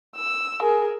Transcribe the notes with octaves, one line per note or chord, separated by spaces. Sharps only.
E6
G#4 A#4